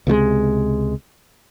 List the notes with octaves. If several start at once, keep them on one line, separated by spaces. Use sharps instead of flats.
C#2 C3 F#3 G#3